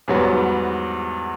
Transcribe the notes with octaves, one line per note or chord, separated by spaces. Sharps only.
E2 G#2 F#3 G3 B3